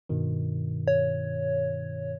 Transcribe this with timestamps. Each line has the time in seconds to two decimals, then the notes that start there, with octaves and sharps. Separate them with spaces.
0.09 G2 B2 D#3
0.88 C#5